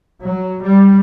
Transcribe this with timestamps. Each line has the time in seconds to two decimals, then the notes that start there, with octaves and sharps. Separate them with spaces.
0.22 F#3
0.61 G3